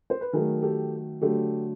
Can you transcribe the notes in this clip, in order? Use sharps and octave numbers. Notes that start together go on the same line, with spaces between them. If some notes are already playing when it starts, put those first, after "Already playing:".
C5
B4
D#3 F#3 A3 G#4 A#4
G4 A4
D3 F#3 A3 G4 A4